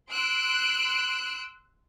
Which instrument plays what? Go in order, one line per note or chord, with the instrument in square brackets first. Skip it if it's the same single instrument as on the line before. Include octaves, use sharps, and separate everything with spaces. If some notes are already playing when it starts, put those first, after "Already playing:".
[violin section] C6 E6 F#6 D7